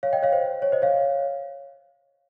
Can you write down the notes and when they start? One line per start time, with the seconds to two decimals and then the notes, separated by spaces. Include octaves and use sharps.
0.03 C#5 F5
0.13 D#5 G5
0.23 C#5 F5
0.33 C5
0.62 C#5
0.72 C5 D#5
0.82 C#5 F5